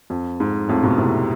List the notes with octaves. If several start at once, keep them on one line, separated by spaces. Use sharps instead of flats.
F2
G#2
F2 A2
G#2 B2
A2 C3